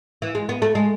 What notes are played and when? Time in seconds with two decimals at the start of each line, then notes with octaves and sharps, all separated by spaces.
0.22 E3
0.35 G#3
0.49 B3
0.62 A3
0.75 G#3